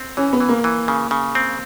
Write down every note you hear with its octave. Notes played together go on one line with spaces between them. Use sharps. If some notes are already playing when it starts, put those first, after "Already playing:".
Already playing: C4
E3 C#4
B3
E3
A#3
E3
C#3
C#3
C4